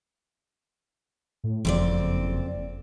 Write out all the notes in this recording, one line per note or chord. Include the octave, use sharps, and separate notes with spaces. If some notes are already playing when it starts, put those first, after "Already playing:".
A2
F#1 F2 C4 D5